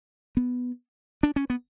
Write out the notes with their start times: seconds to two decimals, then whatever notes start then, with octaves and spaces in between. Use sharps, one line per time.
0.37 B3
1.23 D4
1.36 C#4
1.50 B3